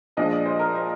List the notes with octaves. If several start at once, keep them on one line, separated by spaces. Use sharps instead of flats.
A#2 F3 G#3 D4 D#5
D5
C5
A#4
C5